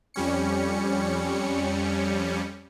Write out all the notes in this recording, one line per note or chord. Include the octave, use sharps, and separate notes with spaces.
F2 G3 C#4 C#7